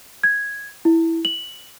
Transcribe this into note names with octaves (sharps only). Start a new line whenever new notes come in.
G#6
E4
F#7